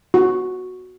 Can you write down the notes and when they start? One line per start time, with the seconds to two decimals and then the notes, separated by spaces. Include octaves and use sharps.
0.14 F#4